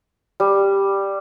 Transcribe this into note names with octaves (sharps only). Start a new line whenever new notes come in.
G3